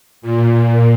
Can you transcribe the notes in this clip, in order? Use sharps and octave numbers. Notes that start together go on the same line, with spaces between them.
A#2